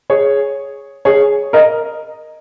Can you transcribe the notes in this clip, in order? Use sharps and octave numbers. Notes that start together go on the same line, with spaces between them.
G#4 C#5
G#4 C#5
A#4 D#5